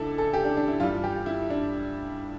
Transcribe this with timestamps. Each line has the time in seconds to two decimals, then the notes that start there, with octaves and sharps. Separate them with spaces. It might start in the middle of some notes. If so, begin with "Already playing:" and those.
Already playing: C#2 D4 E4 A4
0.18 A4
0.33 G4
0.45 D4
0.57 D4
0.68 E4
0.79 G2 E3 G3 F4
1.04 G4
1.26 E4
1.50 D4